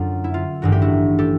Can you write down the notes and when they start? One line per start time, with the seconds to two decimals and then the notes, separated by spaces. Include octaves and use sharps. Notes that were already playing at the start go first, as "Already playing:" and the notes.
Already playing: F#2 D3 F#3 F4
0.24 E4
0.34 F4
0.62 A1 G2 D#3 F#4
0.72 G4
0.82 E4 F#4
1.19 G4 A4